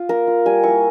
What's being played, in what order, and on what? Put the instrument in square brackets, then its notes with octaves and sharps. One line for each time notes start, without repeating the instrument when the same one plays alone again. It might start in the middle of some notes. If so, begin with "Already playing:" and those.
Already playing: [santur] F4
A#3 A#4
F4
G3 G#5
A#3 E4 C#6